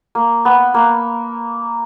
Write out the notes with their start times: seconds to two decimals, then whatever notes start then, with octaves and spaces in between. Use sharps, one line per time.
0.15 A#3
0.45 B3
0.74 A#3